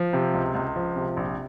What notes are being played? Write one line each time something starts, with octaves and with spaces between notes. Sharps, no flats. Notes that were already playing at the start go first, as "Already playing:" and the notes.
Already playing: F3
C3
C#2
C#2
F3
C3
A#1